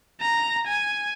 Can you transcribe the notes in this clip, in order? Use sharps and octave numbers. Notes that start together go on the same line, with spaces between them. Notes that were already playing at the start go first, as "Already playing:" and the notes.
A#5
G#5